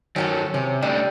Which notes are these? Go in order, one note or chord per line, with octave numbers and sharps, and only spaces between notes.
D#3 F#3 C#4 F#4 A4
C3 C#4
G3 A3 C#4 D4